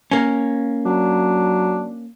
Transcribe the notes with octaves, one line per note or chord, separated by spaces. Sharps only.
A#3 C#4
F#3 D4